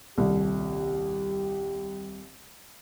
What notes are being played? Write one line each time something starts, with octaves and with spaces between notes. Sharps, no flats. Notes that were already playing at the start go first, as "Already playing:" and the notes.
D#1 C2 G4